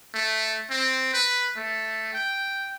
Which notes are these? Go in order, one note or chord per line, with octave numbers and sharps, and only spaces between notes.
A3
C4
B4
A3
G5